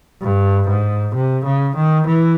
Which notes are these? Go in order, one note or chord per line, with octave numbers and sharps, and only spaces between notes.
G2
G#2
C3
C#3
D#3
E3